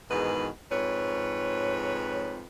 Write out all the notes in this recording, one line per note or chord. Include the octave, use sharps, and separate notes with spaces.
E2 G#2 B2 D#3 B4
F2 G#2 B4 C#5